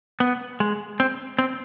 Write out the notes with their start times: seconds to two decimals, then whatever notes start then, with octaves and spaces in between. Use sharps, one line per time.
0.20 B3
0.60 G#3
1.00 C4
1.39 C4